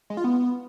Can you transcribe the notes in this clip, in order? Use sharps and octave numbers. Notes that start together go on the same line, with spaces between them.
G#3
F4
B3